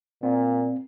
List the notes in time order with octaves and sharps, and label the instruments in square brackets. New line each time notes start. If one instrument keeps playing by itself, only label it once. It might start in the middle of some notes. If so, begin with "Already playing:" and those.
[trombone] A#2 [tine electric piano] C4